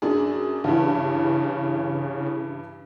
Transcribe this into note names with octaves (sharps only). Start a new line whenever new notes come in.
F#2 D4 G#4
G2 C#3 E3